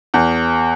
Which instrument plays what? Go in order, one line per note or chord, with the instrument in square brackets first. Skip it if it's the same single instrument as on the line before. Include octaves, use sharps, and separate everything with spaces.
[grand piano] E2